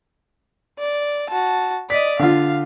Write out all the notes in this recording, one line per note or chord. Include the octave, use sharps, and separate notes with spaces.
D5
F#4 A5
D5 D#5 B6
D3 F4 F5